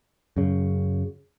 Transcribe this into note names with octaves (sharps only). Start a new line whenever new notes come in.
F#2 C#3